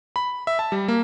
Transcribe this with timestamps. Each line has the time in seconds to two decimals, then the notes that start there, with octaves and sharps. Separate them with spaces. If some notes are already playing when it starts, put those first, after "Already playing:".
0.16 B5
0.47 E5
0.59 A5
0.72 G3
0.88 A#3